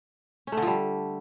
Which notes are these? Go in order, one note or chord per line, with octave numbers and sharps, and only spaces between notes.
C#4
A3
D3
F3
G3